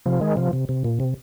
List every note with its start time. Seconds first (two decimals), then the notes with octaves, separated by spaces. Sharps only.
0.06 C3 F3
0.21 D#3 G#3
0.37 C3 F3
0.53 C3
0.69 C3
0.84 A#2
1.00 C3